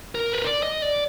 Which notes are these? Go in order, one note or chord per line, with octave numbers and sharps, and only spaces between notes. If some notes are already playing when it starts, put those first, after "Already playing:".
A#4
B4
D5
D#5
D5